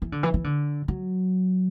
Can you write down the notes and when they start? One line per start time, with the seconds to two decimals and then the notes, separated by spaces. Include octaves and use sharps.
0.02 E3
0.12 D3
0.23 E3
0.34 E3
0.44 D3
0.88 F#3